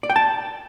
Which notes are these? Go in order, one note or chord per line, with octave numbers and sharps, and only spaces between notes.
D5
G5
A5